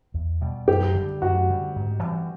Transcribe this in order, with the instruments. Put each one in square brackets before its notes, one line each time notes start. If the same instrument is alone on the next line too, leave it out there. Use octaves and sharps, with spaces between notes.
[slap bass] E2
B2 G3
[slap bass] F#2 [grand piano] G4
[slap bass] D3 G3
[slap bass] F#2 [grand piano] F#4
[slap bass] D3 G3
G#2
E3 G3 C4